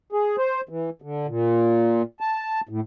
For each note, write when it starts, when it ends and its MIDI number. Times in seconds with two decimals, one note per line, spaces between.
0.12 0.36 68
0.38 0.61 72
0.69 0.90 52
1.02 1.27 50
1.27 2.02 46
2.20 2.61 81
2.69 2.80 45